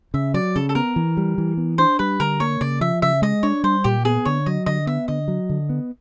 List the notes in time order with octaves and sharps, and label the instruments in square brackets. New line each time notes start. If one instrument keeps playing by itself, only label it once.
[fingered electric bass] C#3 [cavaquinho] E5
[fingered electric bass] F#3 [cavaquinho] D5
[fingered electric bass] C#3 [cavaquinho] A4
[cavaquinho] A4
[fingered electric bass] B3 [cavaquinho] A#4
[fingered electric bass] E3
G3
E3
B3
[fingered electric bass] D4 [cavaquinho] C5
[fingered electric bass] G3 [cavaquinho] B4
[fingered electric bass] D3 [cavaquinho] A#4
[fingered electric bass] A#3 [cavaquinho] C#5
[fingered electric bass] C#3 [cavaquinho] D5
[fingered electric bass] F3 [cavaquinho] E5
[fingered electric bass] C#3 [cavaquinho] E5
[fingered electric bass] G#3 [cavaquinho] D#5
[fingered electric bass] D4 [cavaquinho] C#5
[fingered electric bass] G3 [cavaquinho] C5
[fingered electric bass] A#2 [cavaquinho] G4
[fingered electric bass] B3 [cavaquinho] G#4
[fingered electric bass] D3 [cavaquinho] C#5
[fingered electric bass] F#3 [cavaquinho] D#5
[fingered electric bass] D3 [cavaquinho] D#5
[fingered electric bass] B3 [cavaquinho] E5
[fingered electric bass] D3 [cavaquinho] D#5
[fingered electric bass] F#3
D3
B3